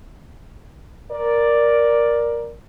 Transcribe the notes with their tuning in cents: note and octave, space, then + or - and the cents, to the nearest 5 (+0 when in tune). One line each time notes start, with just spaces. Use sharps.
A#4 +10 D5 +0